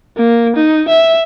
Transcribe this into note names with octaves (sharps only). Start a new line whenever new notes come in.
A#3
D#4
E5